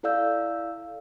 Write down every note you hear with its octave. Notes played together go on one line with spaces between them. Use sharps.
E4 A4 D5 F5 E6 G6